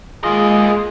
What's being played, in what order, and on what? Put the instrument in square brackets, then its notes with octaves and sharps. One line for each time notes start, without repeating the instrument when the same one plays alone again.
[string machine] G#3 [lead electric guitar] A#3 D#5 [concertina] F4 G#4